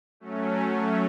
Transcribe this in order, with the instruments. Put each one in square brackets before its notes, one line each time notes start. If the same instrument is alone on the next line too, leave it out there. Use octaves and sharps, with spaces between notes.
[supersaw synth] F#3 A3 C#4